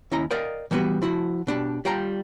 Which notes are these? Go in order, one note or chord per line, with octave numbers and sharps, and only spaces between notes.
D#2 C#4 E4 D#5 A#5
A#4 D5 D#5 F5 G5
E3 G3 B3 F#4 B4
F3 E4 F#4
B2 D4 G4
G3 F4 G5 A5 A#5